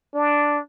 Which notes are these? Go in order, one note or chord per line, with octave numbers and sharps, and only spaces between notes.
D4